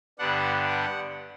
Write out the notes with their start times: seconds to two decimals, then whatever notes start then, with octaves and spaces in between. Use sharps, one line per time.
0.19 G2 D3 G3 B3 D4 F#5
0.67 F#5